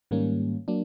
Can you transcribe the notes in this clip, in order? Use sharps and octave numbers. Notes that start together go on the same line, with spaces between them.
G#2 D#3 G3 A#3 C#4
F#3 A#3 D4